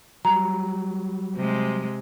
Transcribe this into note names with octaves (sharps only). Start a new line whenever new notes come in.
F#3 G3 A#5
C3 G#3